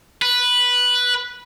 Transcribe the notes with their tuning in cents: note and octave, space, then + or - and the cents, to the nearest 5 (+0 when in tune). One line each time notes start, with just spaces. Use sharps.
B4 -5